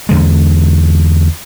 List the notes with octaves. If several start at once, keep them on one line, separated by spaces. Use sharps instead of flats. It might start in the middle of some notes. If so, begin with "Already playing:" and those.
E2 D3 G#3